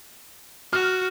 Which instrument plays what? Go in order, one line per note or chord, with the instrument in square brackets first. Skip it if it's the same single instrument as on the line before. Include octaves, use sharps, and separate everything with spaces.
[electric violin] F#4 [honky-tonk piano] F6